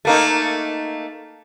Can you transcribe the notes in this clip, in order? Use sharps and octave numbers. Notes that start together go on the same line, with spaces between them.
A3 A#3 D#4